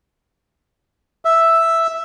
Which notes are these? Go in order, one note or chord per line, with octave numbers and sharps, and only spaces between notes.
E5